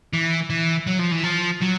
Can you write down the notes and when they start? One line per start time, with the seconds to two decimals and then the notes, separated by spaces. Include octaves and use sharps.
0.13 E3
0.50 E3
0.87 F#3
0.99 F3
1.12 E3
1.23 F3
1.61 F#3